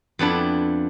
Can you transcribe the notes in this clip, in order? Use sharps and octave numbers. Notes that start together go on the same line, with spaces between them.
F2 B3 D4 E4